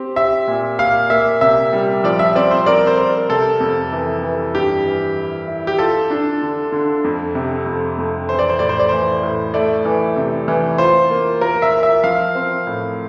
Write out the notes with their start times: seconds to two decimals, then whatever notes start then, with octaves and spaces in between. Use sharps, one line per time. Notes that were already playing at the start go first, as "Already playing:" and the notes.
Already playing: C4 G4
0.16 G4 E5
0.48 A#2
0.79 A#3 F5
1.10 A#3 E5
1.41 C3 E5
1.73 G3
2.04 F3 D5
2.19 E5
2.35 C4 D5
2.51 C5
2.66 A#4 D5
2.87 C5
2.98 A#4
3.29 C3 A4
3.60 F2
3.92 E3
4.22 E3
4.54 G2 G4
4.86 E3
5.17 E4
5.48 E4
5.67 G4
5.78 F4 A4
6.10 D4
6.42 D3
6.72 D3
7.04 F2
7.35 C3
7.66 F2
7.98 F2
8.29 E3 C5
8.39 D5
8.49 C5
8.59 A2 D5
8.69 C5
8.80 D5
8.89 E3 C5
9.23 A2
9.54 A3 D5
9.85 E3
10.16 C3
10.48 E3
10.78 F4 C5
11.10 A#3
11.41 F4 A#4
11.62 E5
11.73 A#4
11.83 E5
12.04 F3 F5
12.35 C4
12.67 A2